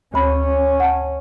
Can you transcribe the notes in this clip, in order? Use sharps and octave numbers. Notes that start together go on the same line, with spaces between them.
D2 C#4 B5
F#5 A5